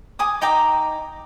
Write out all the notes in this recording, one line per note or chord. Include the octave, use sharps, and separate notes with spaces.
G#5 D6 D#6
D#4 G5 A#5 D6